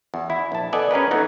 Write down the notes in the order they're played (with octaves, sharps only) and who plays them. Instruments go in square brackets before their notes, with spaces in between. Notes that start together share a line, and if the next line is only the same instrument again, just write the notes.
[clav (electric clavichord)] E2
E4
A#1 A5
B3 A4 D5 D#5 G#5
C#4 G#4 A#4 B4
E3 A3 B3 C#4 D#4